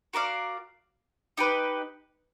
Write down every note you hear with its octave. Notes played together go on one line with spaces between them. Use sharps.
F#4 A#4 D5 F5
D#4 G4 B4